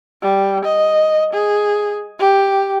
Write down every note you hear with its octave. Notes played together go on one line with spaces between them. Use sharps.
G3
D#5
G#4
G4